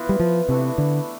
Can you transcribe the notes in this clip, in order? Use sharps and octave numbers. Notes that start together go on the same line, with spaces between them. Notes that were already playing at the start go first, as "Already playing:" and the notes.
Already playing: E3 B3 F4
G3
F3
C3 E3 A3 D4 A4
D3